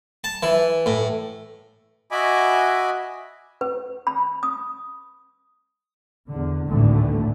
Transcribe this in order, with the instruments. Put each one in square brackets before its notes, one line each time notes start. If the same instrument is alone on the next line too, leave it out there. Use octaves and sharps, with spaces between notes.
[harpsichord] A5
E3
A2
[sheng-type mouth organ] F#4 D#5 E5 G#5 B5 D6
[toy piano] B4
B5
D#6
[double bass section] E2 D3
G#1 D2 A2 D3 E3 A3